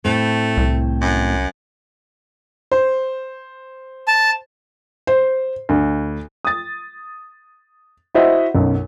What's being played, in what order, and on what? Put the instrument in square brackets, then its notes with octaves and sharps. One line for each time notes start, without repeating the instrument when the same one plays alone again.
[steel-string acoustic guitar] A2 C4 [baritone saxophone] A3
[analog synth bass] C2
[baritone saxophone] F#2
[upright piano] C5
[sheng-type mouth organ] A5
[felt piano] C5
D2
[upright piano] D#6 A6
E4 F#4 C5 D#5 E5 F#5
B1 F#2